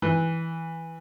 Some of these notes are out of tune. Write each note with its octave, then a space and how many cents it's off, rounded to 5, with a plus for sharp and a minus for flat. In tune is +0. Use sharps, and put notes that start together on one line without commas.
E3 -5